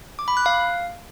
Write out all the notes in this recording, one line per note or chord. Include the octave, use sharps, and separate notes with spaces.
D6
B5
F#6
F5